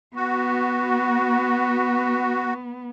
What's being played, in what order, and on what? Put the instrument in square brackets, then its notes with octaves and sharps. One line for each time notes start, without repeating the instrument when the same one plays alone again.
[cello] B3 [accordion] F#4